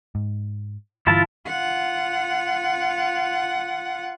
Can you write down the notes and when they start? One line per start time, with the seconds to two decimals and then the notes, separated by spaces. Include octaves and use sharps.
0.15 G#2
1.07 G2 D3 E3 E4 F4 A5
1.47 F4 F#5